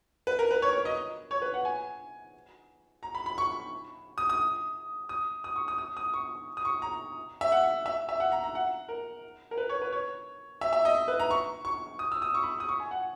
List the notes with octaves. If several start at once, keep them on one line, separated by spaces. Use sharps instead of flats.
B4
A#4
B4
C#5
C#5
D#5
C#5
B4
F#5
G#5
A#5
B5
B5
C#6
D#6
D#6
D#6
D#6
C#6
D#6
D#6
D#6
C#6
D#6
C#6
A#5
E5
F#5
E5
E5
F#5
A#5
A#5
F#5
A#4
A#4
B4
C#5
B4
C#5
E5
E5
D#5
B4
A#5
C#6
C#6
D#6
E6
D#6
C#6
B5
D#6
C#6
G#5
F#5